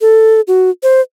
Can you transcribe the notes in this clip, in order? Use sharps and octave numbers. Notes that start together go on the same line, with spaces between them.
A4
F#4
C5